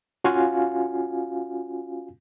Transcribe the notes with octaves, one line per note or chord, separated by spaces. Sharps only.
C#4 F4 F#4 F5 G#5